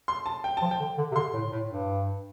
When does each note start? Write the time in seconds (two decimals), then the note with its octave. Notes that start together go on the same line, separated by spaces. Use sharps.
0.08 C6
0.26 A5
0.44 G5
0.57 F3 A5
0.71 G5
0.80 D3
0.98 D3
1.11 C3
1.16 D3 C6
1.34 A2
1.52 A2
1.70 G2